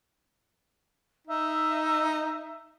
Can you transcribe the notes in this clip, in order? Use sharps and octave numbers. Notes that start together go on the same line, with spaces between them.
D#4 E5